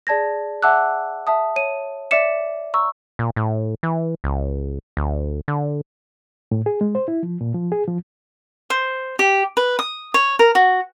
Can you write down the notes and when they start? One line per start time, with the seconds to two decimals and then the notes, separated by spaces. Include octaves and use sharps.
0.07 G#4 D5 A5 G#6 A#6
0.62 E5 F#5 A5 D6 E6 F#6
1.27 E5 A5 D#6
1.56 C#5 D#7
2.11 D5 E5 D6 C#7 E7
2.74 A#5 C#6 E6
3.19 A#2
3.36 A2
3.83 E3
4.24 C#2
4.97 D2
5.48 D3
6.51 A2
6.66 G#4
6.81 G#3
6.95 C5
7.08 E4
7.23 F3
7.41 A#2
7.54 F3
7.72 G#4
7.88 F3
8.70 C5
9.19 G4
9.57 B4
9.79 D#6
10.14 C#5
10.39 A#4
10.55 F#4